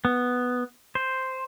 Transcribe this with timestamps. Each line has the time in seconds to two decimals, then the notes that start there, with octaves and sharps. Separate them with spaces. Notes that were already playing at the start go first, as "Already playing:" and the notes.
0.05 B3
0.95 C5